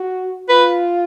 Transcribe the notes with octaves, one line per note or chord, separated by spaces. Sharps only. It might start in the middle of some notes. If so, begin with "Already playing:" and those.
Already playing: F#4
F4 B4